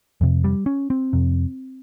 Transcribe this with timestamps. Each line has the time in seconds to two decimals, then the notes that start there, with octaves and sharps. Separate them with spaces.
0.21 F2 C3
0.44 G3
0.66 C#4
0.90 C4
1.13 F2 C3